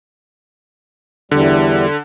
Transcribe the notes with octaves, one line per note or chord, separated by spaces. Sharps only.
E2 D3 G3